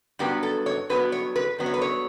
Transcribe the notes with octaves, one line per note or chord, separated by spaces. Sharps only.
G2 F#3 B3 G4
A4
C#5
G2 F#3 B3 B4
C#5
B4
G2 F#3 B3
C#5
B4
C#5